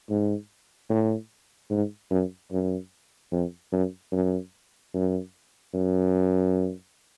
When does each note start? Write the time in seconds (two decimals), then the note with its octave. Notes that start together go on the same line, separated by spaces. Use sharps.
0.10 G#2
0.90 A2
1.71 G#2
2.11 F#2
2.52 F#2
3.32 F2
3.72 F#2
4.12 F#2
4.94 F#2
5.74 F#2